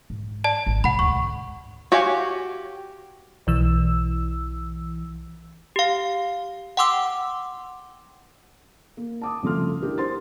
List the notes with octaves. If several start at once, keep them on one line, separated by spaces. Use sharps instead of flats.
G#2
D5 A5
G#1
C3 F#5 B5
D2 G#2 C#6
F#4 G4 C#5 F5 G#5
B1 E3 E6
G4 F5
F#5 G5 C6 D6 E6
A#3
A5 D6 D#6
C2 C#3 F3 A3 C6 F6
D4 E4 G4 A#4
C5 C6 A6